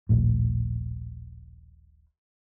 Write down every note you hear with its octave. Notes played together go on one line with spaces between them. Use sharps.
D#1 A#1 A2